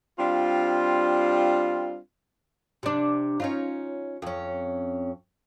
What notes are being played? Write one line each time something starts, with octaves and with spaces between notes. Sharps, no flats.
G3 C4 D4 F4
C3 D4
C#4 D#4 F4
F2 C#4